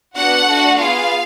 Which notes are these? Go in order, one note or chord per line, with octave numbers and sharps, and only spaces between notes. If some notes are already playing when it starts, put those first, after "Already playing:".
B3 D4 F#4 F#5
A3 D4 F#4
B3 F4 G#4 F5